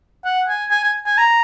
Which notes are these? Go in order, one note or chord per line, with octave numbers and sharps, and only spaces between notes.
F#5
G#5
G#5
G#5
G#5
A#5